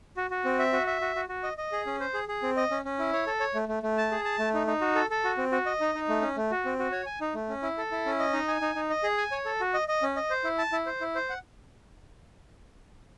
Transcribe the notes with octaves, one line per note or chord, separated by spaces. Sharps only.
F#4
F#4
C4
E5
F#4
E5
F#4
F#4
F#4
D#5
D#5
G#4
C#4
C5
G#4
G#4
C4
D#5
C#4
C#4
E4
C#5
A4
C#5
A3
A3
A3
A5
G#4
A5
A3
D#4
D#4
F#4
A4
A4
F#4
C4
F#4
D#5
D#4
D#4
A3
C#4
A3
F#4
C4
F#4
C#5
G#5
D#4
A3
C#4
E4
A4
E4
C#4
D#5
D#4
G#5
D#4
D#4
D#5
G#4
G#5
C#5
A4
F#4
D#5
D#5
C#4
D#5
C5
E4
A5
E4
C5
E4
C5
F#5